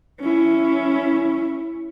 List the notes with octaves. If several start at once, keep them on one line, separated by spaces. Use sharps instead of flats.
C#4 E4